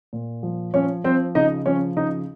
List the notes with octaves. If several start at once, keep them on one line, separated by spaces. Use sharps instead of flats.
A#2
F3
F3 C#4 C#5
F3 C4 C5
C#3 D#4 D#5
F3 C#4 C#5
C#3 D#4 D#5